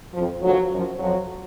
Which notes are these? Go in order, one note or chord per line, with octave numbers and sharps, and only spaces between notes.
F2 F3
D#2 D3 F3 F#3
F#2 F3
F2 F3 F#3